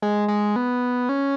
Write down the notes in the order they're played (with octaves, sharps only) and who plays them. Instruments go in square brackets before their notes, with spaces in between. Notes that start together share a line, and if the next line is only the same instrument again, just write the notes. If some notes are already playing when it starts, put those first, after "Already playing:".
[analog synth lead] G#3
G#3
B3
C#4